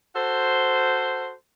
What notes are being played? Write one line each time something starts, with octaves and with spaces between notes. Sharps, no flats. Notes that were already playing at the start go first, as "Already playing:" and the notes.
F#4 A4 C5